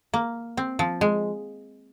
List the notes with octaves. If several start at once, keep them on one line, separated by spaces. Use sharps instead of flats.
A#3
C4
F3
G#3